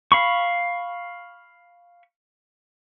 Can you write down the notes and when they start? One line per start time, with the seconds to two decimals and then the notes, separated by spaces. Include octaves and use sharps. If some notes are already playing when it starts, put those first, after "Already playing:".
0.12 F5 B5 C#6